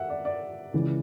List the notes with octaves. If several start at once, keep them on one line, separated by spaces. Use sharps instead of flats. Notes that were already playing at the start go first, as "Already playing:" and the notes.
Already playing: E5 F#5
D5
D5
C#2 C#3 E3